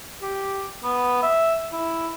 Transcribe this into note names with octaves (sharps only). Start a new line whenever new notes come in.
G4
B3
E5
E4